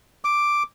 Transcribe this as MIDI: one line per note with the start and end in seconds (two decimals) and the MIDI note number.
0.25 0.63 86